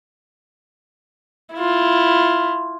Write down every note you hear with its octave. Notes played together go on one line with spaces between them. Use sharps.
E4 F4